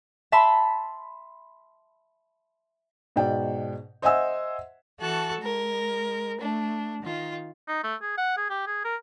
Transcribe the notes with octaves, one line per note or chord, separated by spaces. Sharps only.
E5 A5 B5 C6
G#2 B2 D5 G5
C5 D#5 E5 F#5 G#5 E6
E3 F#4 A4 A5 C#6 F#6
G#3 A#4
A3 D4
D#3 F4
D#4
A3
G#4
F#5
G#4
G4
G#4
A#4